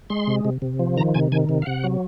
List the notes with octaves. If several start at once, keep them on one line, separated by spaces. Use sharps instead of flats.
G#3 C6
C3
C3
C3
F3
D#3 A#5
C3 G#5
D#3 G#5
C3
F5
C3 F#5
F#3